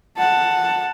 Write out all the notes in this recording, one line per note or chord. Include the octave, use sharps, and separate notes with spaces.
F#5 A5